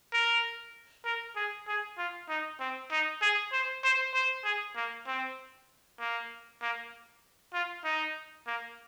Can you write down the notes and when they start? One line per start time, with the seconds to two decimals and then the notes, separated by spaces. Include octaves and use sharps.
0.13 A#4
1.05 A#4
1.36 G#4
1.68 G#4
1.98 F4
2.29 D#4
2.60 C4
2.91 D#4
3.22 G#4
3.53 C5
3.84 C5
4.14 C5
4.45 G#4
4.76 A#3
5.07 C4
6.00 A#3
6.62 A#3
7.54 F4
7.85 D#4
8.47 A#3